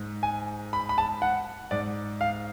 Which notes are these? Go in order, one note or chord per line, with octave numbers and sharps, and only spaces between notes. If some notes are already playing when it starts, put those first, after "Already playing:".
Already playing: G#2
G#5
B5
B5
A5
F#5
G#2 D5
F5